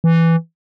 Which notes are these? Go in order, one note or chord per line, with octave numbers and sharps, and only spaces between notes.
E3